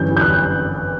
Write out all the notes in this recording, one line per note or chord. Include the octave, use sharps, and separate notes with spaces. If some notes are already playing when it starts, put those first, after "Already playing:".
Already playing: G1 F#2 E3 G3 G6
G6
F#6